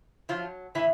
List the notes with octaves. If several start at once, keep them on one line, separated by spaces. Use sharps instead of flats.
F3 F#3 F4
A2 E3 E4